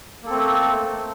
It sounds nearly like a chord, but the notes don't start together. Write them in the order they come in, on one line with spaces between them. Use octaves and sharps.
A#3 A4 C4 A3